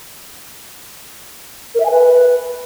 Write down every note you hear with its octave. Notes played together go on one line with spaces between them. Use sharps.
A#4
E5
G#5
B4